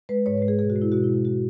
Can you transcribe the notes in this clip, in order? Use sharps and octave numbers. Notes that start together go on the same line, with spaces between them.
G#3 B4
G#2 C#5
B4
G#3
G#4
B2 G#4
F#4
G#3
E4
B2 F#4
E4
G#3
E4
F#4